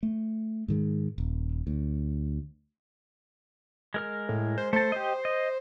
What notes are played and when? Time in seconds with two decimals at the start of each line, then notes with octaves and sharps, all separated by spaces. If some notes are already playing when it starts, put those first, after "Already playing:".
0.03 A3
0.68 G#2 D#3 G#3
1.18 D#1
1.67 D2
3.94 G#3 A#4 F6
4.29 A2
4.58 C5
4.73 A3 A4 C5
4.92 G4 D#5
5.25 D#5